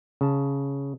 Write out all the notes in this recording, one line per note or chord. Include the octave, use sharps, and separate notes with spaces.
C#3 A5